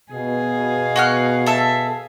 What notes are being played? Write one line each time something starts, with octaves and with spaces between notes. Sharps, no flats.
B2 G#4 F5
F#4 F#5 F6
A4 E5 A5